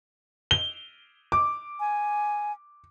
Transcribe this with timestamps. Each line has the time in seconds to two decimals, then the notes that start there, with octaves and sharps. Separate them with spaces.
0.51 G7
1.32 D6
1.80 G#5